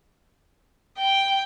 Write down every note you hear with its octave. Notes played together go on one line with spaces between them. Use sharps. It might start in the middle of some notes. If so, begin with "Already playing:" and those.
G5